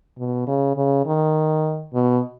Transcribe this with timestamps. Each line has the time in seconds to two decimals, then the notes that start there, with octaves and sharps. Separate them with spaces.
0.18 B2
0.47 C#3
0.76 C#3
1.06 D#3
1.93 B2